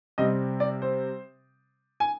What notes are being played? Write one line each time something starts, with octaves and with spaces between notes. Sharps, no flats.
C3 G3 C4 D#5
D5
C5
G#5